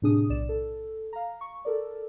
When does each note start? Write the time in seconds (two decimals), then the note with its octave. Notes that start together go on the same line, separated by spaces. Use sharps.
0.02 A2 C3 D4 G#4 D#6
0.30 B1 D5 E7
0.49 A4
1.13 F5 A#5
1.41 C#6
1.65 A4 A#4 D5